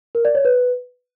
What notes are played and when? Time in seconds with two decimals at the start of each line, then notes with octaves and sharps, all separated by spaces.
0.15 A#4
0.25 D5
0.35 C#5
0.45 B4